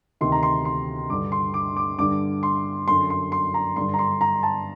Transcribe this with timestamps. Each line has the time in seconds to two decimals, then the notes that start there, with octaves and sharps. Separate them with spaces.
0.21 D2 C3 D#3 C6
0.32 A#5
0.43 C6
0.65 C6
1.10 G2 D3 D6
1.32 C6
1.54 D6
1.76 D6
1.99 G2 D3 D6
2.43 C6
2.87 F#2 D3 C6
3.10 C6
3.32 C6
3.54 A#5
3.76 G2 D3 C6
3.94 A#5
3.99 C6
4.21 A#5
4.43 A5